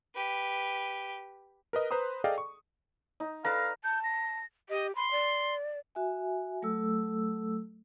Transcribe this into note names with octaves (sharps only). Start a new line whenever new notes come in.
G4 B4
A#4 B4 D#5
B4 C5 A#5 C6 D#6
G#4 A4 D5 D#5 F5 G5
C#6
D#4
A4 B4 D5 F5 A#5
A5 G6
A#6
G4 D#5
B5 C6
D5
F#4 E5 G#5
F#3 A3 A4 E6